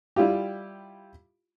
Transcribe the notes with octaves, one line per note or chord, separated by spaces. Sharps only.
G3 E4 F4 G4